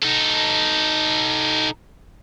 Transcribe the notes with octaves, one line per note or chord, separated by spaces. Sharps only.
D#4 A4